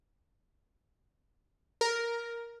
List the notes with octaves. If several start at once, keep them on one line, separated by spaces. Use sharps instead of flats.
A#4